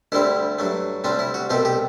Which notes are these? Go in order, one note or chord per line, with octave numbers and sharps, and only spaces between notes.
D2 D3 G3 C4 E4
G2 F#3 A3
D2 C3 G3 C4 D4
E4
F#4
C2 B2 A3 C4 G4
G4